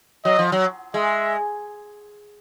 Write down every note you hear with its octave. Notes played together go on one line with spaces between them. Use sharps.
F#3 D#5
F3
F#3
G#3 E5